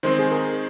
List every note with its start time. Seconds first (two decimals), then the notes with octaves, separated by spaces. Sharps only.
0.03 D#3 G#3 C4 D#4 C5
0.19 G#4
0.31 A#4